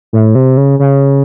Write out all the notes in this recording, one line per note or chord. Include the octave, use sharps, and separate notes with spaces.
A2
C3
C#3
C#3